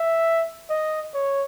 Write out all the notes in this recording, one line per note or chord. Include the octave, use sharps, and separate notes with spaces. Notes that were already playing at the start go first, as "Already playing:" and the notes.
Already playing: E5
D#5
C#5